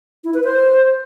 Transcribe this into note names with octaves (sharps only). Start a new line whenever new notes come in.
E4
B4
C5